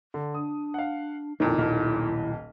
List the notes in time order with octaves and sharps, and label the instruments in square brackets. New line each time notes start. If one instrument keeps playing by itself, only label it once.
[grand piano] D3
[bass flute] D4 [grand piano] D#6
[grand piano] F5 F#5
[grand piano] B1 F2 [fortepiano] A#2 D#3 [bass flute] E4
[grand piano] D#1 B1 F6